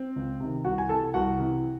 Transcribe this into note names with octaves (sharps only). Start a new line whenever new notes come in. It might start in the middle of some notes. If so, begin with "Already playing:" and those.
Already playing: C4
C#2
C3 D#3
C2 F#4 F#5
G#5
C3 E3 A4 A5
C2 F#4 F#5
C3 E3